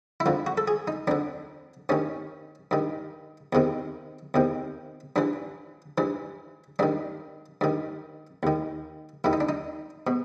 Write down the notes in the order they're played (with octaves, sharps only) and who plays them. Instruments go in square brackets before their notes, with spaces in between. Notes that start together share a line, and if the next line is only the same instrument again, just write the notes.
[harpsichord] E4
F2 D3 F4
F#4
A4
G#4
D#4
F2 D3 D4
G2 D#3 C#4
G2 D#3
E2 C3 D#3
E2 C3 D#3
G2 E3 D4
G2 E3
G2 D#3 D4
G2 D#3
D#2 D#3
D#2 D#3 E4
D#4
D4
D#4
B2